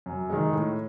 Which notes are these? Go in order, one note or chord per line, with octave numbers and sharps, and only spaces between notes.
F#2
D#3 G#3
A2